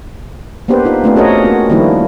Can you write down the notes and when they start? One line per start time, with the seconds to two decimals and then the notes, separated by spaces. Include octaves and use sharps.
0.68 A#3 B3 D4 G4 B4 C5
0.85 D#4 F4
1.04 A3 B3 C4 D4 F4 B4
1.16 C#4 F#4 G#4 A#4 C#5 D#5
1.44 A#3 F#4
1.70 D#3 F3 G3 A#3 D4 E4